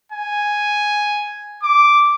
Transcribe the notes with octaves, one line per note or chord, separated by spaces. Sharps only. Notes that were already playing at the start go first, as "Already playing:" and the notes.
G#5
D6